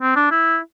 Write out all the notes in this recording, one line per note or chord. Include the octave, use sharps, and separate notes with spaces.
C4
D4
E4